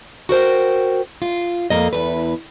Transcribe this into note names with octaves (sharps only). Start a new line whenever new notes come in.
F#4 A#4 C5 G5
F4
F2 A#3 D#5
E2 B4